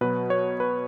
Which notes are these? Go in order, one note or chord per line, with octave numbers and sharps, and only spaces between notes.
B2 F#3 B4
C#5
B4